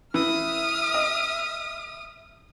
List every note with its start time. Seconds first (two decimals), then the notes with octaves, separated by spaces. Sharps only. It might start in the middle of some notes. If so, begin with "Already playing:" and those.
0.14 E3 E5 D#6 F6
0.94 D#5